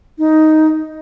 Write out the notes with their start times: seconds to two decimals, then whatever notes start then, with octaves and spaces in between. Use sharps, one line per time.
0.18 D#4